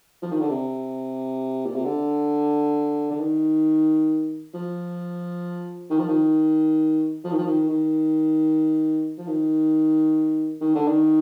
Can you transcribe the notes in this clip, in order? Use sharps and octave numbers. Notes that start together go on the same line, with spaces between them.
F3
D#3
D3
C3
A#2
C3
D3
D3
D#3
F3
D#3
F3
D#3
F3
D#3
F3
D#3
D#3
F3
D#3
D#3
D3
D#3